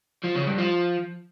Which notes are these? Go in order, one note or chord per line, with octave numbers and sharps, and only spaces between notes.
F3
C#3
G2
F3